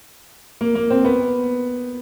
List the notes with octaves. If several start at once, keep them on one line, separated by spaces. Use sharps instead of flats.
A#3
A#3
C4
B3